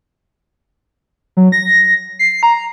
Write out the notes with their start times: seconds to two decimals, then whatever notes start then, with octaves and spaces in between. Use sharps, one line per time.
1.37 F#3
1.52 A#6
2.19 C7
2.43 A#5